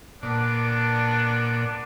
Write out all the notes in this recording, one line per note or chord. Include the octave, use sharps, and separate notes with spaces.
A#2 B3 D4 D5